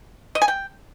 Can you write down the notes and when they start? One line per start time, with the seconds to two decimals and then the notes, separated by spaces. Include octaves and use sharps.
0.35 D#5
0.42 G#5
0.48 G5